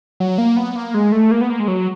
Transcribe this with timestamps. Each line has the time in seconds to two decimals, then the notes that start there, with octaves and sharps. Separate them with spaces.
0.20 F#3
0.38 A#3
0.57 B3
0.76 A#3
0.94 G#3
1.12 A3
1.31 A#3
1.41 B3
1.50 A#3
1.60 G#3
1.68 F#3